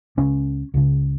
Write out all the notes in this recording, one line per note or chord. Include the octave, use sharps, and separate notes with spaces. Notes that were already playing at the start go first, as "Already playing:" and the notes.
C#2 C#3 C#4
C#2 C#3